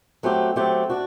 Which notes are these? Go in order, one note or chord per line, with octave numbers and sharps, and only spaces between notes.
F#3 A3 C4 G4
F#3 A3 C4 G4
D4 F#4